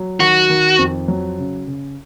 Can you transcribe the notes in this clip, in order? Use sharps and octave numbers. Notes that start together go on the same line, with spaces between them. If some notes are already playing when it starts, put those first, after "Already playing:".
Already playing: F#3
D#3 F#4
D#3
F2
F#3
C#3
C#3